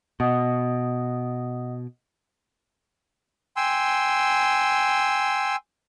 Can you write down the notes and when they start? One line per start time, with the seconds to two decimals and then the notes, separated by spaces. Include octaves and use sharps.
0.20 B2 D#5 F#5 D#6
3.57 G5 G#5 C6 E6